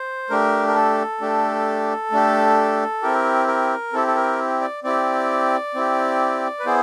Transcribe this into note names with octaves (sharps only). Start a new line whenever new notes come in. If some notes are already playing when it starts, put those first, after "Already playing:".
Already playing: C5
A3 D4 G4 A#4
A#4
A4
A3 D4 G4
A3 D4 G4
C4 E4 G4 A#4
A#4
C4 E4 G4 A4
A4
A#4
D5
C4 E4 G4 D5
C4 E4 G4
B4
B3 E4 G#4 C5